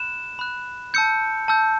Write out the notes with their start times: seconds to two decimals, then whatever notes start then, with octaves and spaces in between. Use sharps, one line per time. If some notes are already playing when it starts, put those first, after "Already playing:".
Already playing: B5 F#6 E7
0.39 B5 F#6
0.94 A5 E6 G6 C#7
1.48 A5 E6 G6